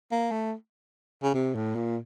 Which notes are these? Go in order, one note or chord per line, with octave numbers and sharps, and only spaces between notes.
A#3
A3
C#3
C3
A2
A#2